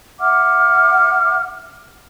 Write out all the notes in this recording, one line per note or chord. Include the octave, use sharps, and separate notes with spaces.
E5 F#5 D6 F6